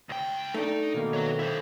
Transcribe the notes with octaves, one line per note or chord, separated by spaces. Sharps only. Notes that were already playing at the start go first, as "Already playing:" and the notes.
C#2 G5
A3 D4 D#4
B2 D#3 A#3
F#4 C#5
E4 C5